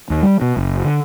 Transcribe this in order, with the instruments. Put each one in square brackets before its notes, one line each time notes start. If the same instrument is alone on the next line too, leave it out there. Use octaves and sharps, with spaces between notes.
[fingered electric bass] D#2
G3
B2
F#1
D3